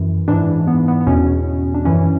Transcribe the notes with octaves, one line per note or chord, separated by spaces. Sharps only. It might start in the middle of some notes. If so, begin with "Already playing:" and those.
Already playing: F#2 E3
G#2 E3 D4
B3
B3
B3
E2 B2 C#4
D4
F#2 E3 C#4